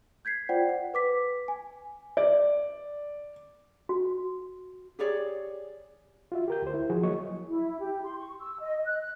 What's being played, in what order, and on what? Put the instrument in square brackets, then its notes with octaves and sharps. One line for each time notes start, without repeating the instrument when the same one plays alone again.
[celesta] G6 G#6 B6 C7
F4 C5 D5 F#5 G5
F#5
B4 D6 B6
G#5
[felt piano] D5
[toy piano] F#4
[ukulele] G4 G#4 C#5 D5
[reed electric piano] F4 F#4 E5
G4 A#4 G6
D2 C5
E4
F3 F#4 G#4
F#3 A#3 C#5 D#5 C#6
[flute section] E4
G4
C6
C#6
E6
D#5
F#6
F#6